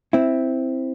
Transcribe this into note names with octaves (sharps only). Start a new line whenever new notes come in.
C4 E4